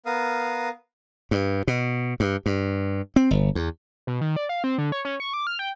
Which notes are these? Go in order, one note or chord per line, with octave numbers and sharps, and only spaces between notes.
B3 A#4 F5 D#6
G2
B2
G2
G2
C4
G1
E2
B2
D#3
D5
F5
C4
D3
C#5
C#4
C#6
D6
F6
G5